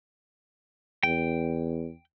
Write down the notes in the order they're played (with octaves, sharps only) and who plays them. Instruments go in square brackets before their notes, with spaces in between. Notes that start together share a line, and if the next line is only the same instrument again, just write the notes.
[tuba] E2 [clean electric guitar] G5